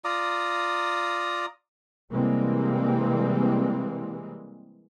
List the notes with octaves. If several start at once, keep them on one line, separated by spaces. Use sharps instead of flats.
F4 D5 A#5 D#6
C3 E3 G3 G#3 A#3 C4